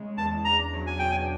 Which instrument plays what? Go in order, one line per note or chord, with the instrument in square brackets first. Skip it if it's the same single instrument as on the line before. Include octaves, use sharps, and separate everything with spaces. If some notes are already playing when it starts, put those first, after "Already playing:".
Already playing: [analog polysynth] C#3 G#3
[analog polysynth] E2 [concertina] A5
[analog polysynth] D4 [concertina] A#5
[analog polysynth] F#3
[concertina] G#5
[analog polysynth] B2 [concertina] G5
[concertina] G#5